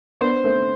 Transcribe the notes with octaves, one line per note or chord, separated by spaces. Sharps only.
B3 D4 C5
A3 C4